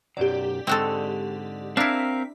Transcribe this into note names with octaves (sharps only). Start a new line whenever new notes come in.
B1 F#2 F#3 G4 D5
G#2 D3 G#3 C4 F#4 A4
C4 D4 E4 A#4 F5 B6